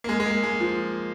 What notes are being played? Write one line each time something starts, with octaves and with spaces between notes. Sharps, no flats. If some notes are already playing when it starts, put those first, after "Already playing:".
A#3
G#3
G#3
A#3
G#3
F3